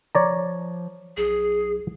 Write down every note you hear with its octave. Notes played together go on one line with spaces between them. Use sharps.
F3 C#5 D5 A#5
B1 G#4